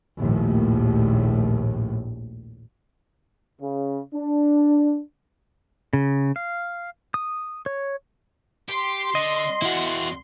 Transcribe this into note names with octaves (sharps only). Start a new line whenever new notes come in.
A#1 D#2 A2
C#3
D4
C#3
F5
D#6
C#5
G4 C6
D3 D#5
E2 B3 E4 F#4